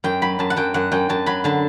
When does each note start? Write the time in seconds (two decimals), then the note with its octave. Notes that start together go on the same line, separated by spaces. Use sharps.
0.04 F#2 G5
0.22 F#3 B5
0.39 F#2 A5
0.50 F#5
0.56 F#2 G5
0.74 F#2 F#5
0.92 F#2 G5
1.09 F#2 A5
1.26 F#3 B5
1.44 D3 A5